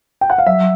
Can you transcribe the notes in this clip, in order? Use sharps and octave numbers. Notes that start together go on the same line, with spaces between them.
G5
F#5
F5
F#3 E5